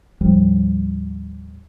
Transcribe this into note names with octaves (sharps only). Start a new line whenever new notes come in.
D#2 A2 F3 G3